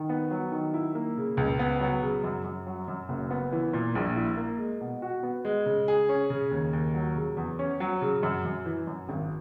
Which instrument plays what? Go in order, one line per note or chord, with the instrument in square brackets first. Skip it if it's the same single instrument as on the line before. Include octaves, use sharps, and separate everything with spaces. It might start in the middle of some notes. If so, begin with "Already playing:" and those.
Already playing: [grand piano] D#3
B3
F#3
D#3
E4
A#3
C#3
C#2
B3
F#3
C#3
F#2
F#2
F#3
F#2
F#1
B3
E3
A#2
A#1
E4
A#3
G#3
B2
F#4
B3
G#3
C#3
G#4
C#4
C#3
D#2
D#2
F#3
C#3
E2
C#4
F#3
C#3
F#2
F#2
E3
F#2
G#1